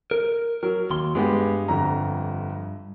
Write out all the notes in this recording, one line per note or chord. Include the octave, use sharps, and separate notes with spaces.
A#4
F#3 A#4
D#2 C6
G2 G#3 B3 G4
G1 F2 A#5